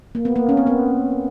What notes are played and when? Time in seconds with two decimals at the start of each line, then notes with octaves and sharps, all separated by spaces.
0.15 A#3
0.25 B3
0.36 A#3
0.49 C#4
0.57 C4
0.67 B3